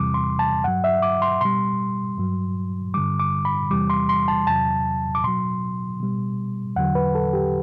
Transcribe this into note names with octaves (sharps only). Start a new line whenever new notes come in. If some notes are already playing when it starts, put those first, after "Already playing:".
Already playing: E2 C3 E3 G3 D6
C6
A5
G2 F#3 F#5
E5
D6
C6
B2 G3 C6
G2 F#3
G2 D3 G3 D6
D6
B5
E2 C3 E3 G3 D6
C6
C6
A5
E2 C3 F#3 A5
D6
B2 F#3 C6
B2 G3
E2 D3 F#3 F#5
B4
A4
G4